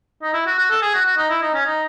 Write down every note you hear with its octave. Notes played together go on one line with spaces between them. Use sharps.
D#4
E4
F#4
F#4
A4
G#4
F#4
F#4
D#4
E4
D#4
C#4
D#4